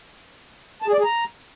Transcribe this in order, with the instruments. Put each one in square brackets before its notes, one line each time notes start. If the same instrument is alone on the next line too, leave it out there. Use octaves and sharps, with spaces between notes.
[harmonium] A5
G#4
D5
G#4
A#5